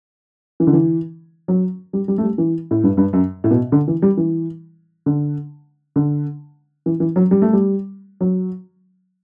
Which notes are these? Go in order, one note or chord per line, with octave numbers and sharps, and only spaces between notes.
E3
D3
E3
F#3
G3
G3
A3
G3
E3
A2
G2
G2
F#2
A2
B2
D3
E3
G3
E3
D3
D3
E3
E3
F#3
G3
A3
G3
F#3